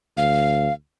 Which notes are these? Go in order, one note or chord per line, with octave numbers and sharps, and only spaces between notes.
D2 F5